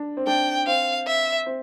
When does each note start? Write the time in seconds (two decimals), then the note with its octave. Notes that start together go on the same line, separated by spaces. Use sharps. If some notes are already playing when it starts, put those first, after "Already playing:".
Already playing: D4
0.17 C4
0.27 D4 G5
0.67 C4 F5
1.07 E5
1.46 C4